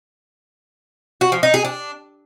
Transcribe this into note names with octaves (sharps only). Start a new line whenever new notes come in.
F#4
F3
D#4
G#4
D4